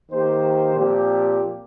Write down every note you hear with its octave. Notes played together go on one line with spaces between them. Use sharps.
D#3 A#3 G4 C5
A#2 F3 C4 G4